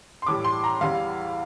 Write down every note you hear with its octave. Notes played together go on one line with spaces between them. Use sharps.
C6
A2 E3 G3 D6
C6
A#5
E2 E3 G3 F5